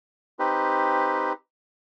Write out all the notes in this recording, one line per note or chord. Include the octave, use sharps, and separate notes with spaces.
C4 D#4 G4 B4